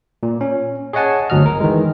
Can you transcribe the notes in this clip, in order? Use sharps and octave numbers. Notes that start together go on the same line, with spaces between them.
A#2
C#4
G#4 C#5 D#5 F#5 G#5 A5
G1 D2 F#3 D#5 F6
A#4
D#3 E3 G#3